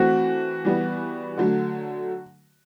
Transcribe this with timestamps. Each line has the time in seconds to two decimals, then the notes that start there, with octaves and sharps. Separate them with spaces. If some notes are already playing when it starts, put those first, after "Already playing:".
Already playing: E3 A3 C4 F#4
0.65 E3 G3 B3
1.37 D3 F#3 A3